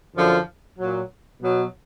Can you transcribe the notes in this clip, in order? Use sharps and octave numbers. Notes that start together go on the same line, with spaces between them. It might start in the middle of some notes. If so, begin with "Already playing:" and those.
F#2 D3 F3
A#2 F#3
B2 F#3